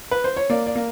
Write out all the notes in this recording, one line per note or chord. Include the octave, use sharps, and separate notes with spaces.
B4
C5
C#5
A#3 D5
D5
A#3